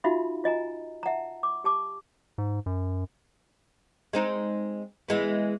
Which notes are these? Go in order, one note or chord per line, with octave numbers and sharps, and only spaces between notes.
D#4 F4 F#4 E5 F5 B5
F4 D#5 G#5 A#5
E5 F#5 A5 A#5
D6
G4 A5 D6
G#2
F#2
G#3 C4 D#4
E3 G#3 B3